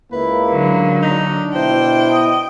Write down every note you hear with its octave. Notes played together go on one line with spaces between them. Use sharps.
C#2 A#3 E4 B4
D3 F#3
D4 D#4
B2 E4 C5 G5
D#5